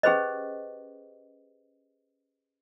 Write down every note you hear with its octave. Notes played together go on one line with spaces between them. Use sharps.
C#4 G4 G#4 B4 C5 D#5